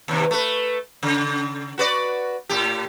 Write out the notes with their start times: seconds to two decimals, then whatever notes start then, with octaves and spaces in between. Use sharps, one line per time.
0.08 D#2 C3
0.31 A3 B4
1.03 C#3
1.78 F#4 B4 D5
2.49 A2 G4